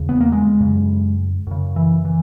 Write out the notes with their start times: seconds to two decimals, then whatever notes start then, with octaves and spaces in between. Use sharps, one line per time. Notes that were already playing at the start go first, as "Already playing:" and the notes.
Already playing: E2 C#3
0.09 B3
0.20 A#3
0.32 G#3
0.60 F#2 C#3
1.47 F#2 C#3
1.76 E3
2.05 E3